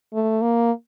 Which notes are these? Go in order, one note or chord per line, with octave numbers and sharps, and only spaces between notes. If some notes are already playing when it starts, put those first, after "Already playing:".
A3
A#3